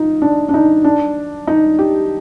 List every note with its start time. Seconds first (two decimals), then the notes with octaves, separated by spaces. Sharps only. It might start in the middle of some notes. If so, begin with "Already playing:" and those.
Already playing: D#4 F4
0.22 D4
0.49 D4
0.54 D#4
0.84 D4
1.47 D#4
1.79 G4